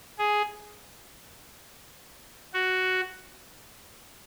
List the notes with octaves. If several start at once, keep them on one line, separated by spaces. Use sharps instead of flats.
G#4
F#4